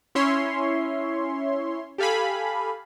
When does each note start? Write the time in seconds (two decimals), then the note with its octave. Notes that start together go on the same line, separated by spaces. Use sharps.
0.15 C#4 E4 C#5 E5 C6
1.98 G4 A4 F5 G#5 B5